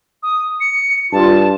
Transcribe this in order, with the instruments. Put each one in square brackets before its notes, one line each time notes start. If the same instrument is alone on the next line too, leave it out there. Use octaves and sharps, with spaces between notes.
[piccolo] D#6
C#7
[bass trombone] G2 [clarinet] F4 [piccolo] A5